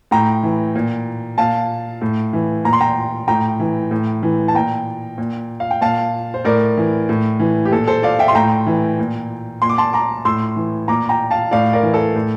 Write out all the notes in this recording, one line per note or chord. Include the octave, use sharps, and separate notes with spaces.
A2 G5 A#5
E3
A#2
A#2 F5 A5
A2
E3
A#2 A#5
C6
G5 A#5
A2 G5 A#5
E3
A2
E3
A5
A#2 G5 A#5
A#2
F5
G5
A#2 F5 A5
C5
A2 A#4 D5
E3
A2
E3
G4
A#2 A4
A4 C5
D5 F5
E5 G5
C6
A2 G5 A#5
E3
A#2
A#2 C6
D6
A5 C6
A#5 D6
A2 C6 E6
E3
A#2 A#5 D6
G5 A#5
F5 A5
A2 D5 F5
A#4 D5
E3
A4
A2